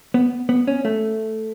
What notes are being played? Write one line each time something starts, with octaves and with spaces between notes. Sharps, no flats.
B3
B3
C#4
A3